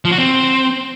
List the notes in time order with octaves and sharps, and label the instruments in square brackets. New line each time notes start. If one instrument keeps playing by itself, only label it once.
[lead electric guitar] F3
F#4
C4